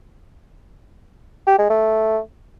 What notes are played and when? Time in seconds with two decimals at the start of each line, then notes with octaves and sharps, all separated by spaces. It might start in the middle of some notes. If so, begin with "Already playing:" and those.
1.47 G4
1.58 G#3
1.70 A3